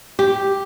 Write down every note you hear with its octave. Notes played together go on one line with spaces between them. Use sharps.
G4